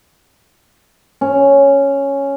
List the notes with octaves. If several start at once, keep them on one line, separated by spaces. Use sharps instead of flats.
C#4